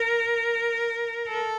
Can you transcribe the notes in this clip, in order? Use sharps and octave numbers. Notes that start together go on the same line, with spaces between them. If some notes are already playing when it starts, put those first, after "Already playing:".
Already playing: A#4
A4